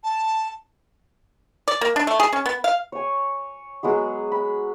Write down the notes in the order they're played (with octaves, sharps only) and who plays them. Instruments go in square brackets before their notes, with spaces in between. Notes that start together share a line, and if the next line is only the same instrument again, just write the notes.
[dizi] A5
[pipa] D5
A#3
D4
A3
G#4
C#4
B3
F5
[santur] C#5 G#5
F#3 G#3 B3 G#4
B5